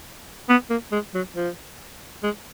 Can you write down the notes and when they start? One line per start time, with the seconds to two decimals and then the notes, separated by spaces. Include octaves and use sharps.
0.49 B3
0.70 A#3
0.92 G#3
1.14 F#3
1.36 F3
2.23 G#3